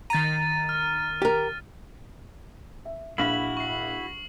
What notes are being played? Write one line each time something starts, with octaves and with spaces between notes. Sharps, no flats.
D#3 A#5 A6 D#7
F6
G4 A#4
E5
A#1 E4 F#4 F5 B5 F6 F#7
C#6 C7